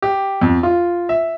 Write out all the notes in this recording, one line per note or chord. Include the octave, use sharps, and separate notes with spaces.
G4
F2
F4
E5